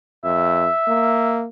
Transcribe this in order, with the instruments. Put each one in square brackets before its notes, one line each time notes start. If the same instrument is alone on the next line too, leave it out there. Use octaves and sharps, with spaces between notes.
[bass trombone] F2 [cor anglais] E5
[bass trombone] A#3